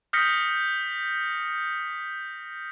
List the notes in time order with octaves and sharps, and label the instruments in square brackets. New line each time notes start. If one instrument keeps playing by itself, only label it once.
[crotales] D#6 F6 G6 A#6 B6 C#7